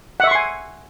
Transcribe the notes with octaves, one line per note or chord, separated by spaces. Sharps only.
E5 F#5 G#5 C6 C#6